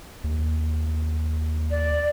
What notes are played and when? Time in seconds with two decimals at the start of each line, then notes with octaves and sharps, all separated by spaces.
0.24 D#2
1.71 D5